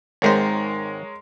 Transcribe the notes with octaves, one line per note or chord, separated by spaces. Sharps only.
G#1 D#3 G#3 A#4 C5 C#5